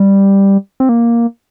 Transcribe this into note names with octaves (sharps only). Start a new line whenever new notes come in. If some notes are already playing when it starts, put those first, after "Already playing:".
Already playing: G3
C4
A#3